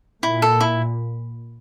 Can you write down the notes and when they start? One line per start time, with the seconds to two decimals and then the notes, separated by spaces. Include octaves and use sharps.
0.23 A#2 E4
0.42 A4
0.61 E4